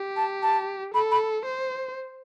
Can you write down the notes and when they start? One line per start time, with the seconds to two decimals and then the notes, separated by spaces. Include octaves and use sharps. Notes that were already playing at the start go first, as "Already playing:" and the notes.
Already playing: G4
0.16 A5
0.43 A5
0.94 A4 B5
1.11 B5
1.46 C5